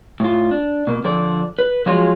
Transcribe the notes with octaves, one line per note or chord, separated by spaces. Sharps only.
A2 F4
D4
B2 A#3
D3 F3 A4 C5 D5
B4
F3 F#3 G#3 F4 F#4